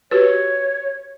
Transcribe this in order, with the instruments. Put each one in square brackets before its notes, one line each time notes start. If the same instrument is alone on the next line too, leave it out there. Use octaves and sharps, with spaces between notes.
[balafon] F#4 G4 B4 [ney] C#5